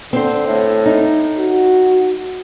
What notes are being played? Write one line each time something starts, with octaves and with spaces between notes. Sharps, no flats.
D3 C4 C5
A2
D#4
F#4